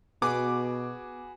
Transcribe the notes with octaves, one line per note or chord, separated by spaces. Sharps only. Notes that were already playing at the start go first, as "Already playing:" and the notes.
B2 B3 F#4 G#4 B4 D6